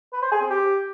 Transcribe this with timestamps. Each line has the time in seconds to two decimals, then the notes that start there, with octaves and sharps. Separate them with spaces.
0.13 B4
0.22 C5
0.32 G#4
0.41 C4
0.50 G4